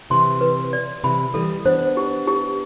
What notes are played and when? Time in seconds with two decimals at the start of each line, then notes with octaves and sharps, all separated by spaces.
0.10 C3 E3 C6
0.41 B4
0.73 D5
1.04 C3 E3 B5
1.34 E3 G3 A4
1.65 B3 D4 C5
1.97 G4
2.27 G4